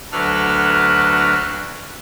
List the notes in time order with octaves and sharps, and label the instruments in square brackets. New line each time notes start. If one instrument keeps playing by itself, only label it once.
[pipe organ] D2 F#3 D4 A4 B4 F6